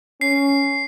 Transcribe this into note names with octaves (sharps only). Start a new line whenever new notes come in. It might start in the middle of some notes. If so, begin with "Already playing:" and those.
C#4 C7